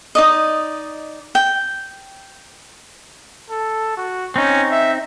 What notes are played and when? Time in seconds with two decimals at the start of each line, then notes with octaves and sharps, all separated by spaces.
0.15 D#4 D5 D#5
1.35 G5
3.50 A4
3.97 F#4
4.36 C4 C#4 D#4
4.71 E5